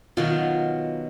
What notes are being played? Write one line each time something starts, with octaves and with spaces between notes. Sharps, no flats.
B2 D#3 F#3 F4